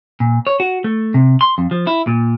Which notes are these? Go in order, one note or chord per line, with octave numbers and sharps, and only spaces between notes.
A#2
C#5
F#4
A3
C3
C6
F2
F3
E4
A#2